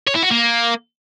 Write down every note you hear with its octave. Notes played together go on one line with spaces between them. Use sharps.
C#5
E4
F#4
A#3